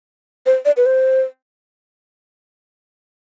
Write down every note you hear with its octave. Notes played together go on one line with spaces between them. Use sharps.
C5
D5
B4
C5